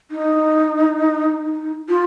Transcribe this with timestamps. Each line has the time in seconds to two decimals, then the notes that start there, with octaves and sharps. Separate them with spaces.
0.11 D#4
1.89 F4